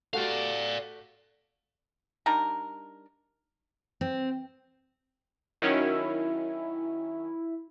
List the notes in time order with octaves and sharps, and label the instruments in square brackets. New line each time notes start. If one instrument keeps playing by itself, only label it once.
[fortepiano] A3 F#4 G4 [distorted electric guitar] D5 F5
[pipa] G3 D4 D#4 A#4
[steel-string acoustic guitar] C4
[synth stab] D#3 F#3 C#4 [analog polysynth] E4